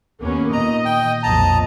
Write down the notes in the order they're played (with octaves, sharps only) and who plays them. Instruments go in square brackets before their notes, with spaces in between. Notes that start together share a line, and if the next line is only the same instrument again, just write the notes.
[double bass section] D#2 [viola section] A#3 B3 C#4
[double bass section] A#2 D#3 [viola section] D#5 [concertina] A#5
[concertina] G5
[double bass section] B1 F2 A#2 [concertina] A5 A#5